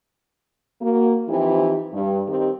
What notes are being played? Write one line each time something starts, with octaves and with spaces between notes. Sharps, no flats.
A#3 F#4
E3 F3 C4 D#4 E4 G4
G2
D#3 C4 D#4 G4